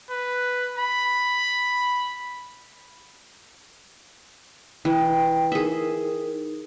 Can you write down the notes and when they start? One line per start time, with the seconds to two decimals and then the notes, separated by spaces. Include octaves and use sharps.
0.11 B4
0.78 B5
4.85 E3 G5
5.52 D#4 G#4 A#4 E5